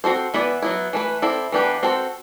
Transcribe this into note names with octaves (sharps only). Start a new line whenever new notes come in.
C4 F#4 A4 C5
E3 B3 E4 B4 D5
F#3 B3 E4
E3 A3 E4 B4
C4 E4 A4 D5
E3 B3 D4 G4 B4
C4 F#4 A4 C5